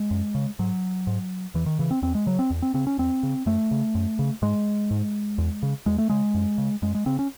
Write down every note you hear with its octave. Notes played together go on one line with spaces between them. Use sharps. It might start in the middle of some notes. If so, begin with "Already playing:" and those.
Already playing: G#3
F#2
C#3
G#2 F#3
G#2
E2 E3
D#3
C#3 E3
C4
E2 C4
G#3
C#3 F#3
C4
E2
C4
C#3 C4
C#4
E2 C4
C#3
F#2 A3
C#3
F#2
C#3
G#2 G#3
G#2
E2
C#3
E2 G#3
A3
C#3 G#3
F#2
C#3
F#2 G#3
G#3
C#3 C4
C#4